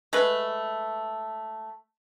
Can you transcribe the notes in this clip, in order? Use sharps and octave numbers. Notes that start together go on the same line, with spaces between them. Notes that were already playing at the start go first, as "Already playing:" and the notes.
G#3 A3 B4